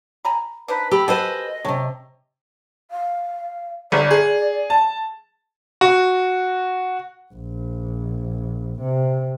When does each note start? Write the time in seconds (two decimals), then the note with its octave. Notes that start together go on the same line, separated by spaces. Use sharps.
0.25 G#5 A#5 B5
0.68 D4 D#4 B4 C5
0.91 G4 A4 B5
1.08 B2 A4 B4 C5 D#5 G#5
1.65 D#2 C3 C#5 A5
2.91 F5
3.92 G1 D5
4.11 G#4
4.70 A5
5.81 F#4
7.33 A#1
8.81 C3